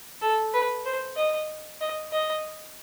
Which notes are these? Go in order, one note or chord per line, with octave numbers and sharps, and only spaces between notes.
A4
B4
C5
D#5
D#5
D#5